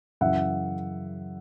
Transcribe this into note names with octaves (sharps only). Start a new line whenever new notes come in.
F#2 C#3 E3 E5 F#5